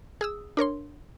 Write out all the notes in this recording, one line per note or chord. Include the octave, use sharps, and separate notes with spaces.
G#4 D#6 E6
D4 A#4 C#5 C6